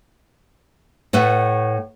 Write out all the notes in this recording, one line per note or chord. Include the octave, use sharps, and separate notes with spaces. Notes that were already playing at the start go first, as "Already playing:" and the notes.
A2 A3 B4 F#5